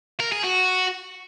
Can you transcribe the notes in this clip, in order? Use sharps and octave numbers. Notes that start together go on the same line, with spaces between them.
A#4
G#4
F#4